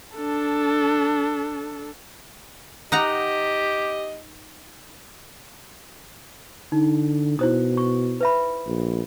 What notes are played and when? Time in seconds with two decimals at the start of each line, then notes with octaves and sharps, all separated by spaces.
0.16 D4 A4
2.92 D#4 G4 D#5 F#5 A#5
6.72 D3 D#4
7.39 B2 E4 C5 D#6
7.77 C#6
8.21 B4 E5 B5
8.67 A#1